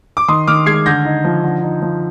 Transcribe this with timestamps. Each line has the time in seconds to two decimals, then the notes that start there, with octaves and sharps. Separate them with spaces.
0.17 D6
0.28 D#3 C6 D#6
0.48 D#3 D6 F6
0.66 G#3 G#6 C7
0.86 D3 G6 A#6
1.05 D#4
1.25 F3
1.44 D3
1.63 D#4
1.82 F3